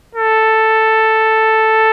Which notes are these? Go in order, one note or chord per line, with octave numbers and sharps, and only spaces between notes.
A4